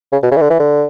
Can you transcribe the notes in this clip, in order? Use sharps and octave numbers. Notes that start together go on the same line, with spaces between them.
C#3
B2
C#3
E3
D3
E3
D3